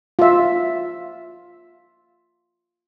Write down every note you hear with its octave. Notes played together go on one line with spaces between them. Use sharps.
F4 E5